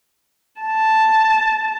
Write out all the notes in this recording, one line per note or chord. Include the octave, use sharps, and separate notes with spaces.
A5